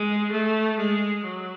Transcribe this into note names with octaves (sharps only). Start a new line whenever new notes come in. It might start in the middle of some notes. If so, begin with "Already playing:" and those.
Already playing: G#3
A3
G#3
F#3